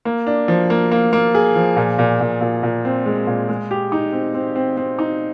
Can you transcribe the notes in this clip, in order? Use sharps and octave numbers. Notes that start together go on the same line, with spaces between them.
A#3
D4
F3
A#3
A#3
A#3
G#4
F3
A#2
A#2
A#2
A#2
A#2
C4
G#3
A#2
G#3
G4
D#4
C4
C4
C4
C4
D#4